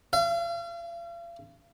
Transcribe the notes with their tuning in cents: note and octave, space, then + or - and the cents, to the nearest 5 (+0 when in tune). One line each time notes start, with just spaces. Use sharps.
F5 -40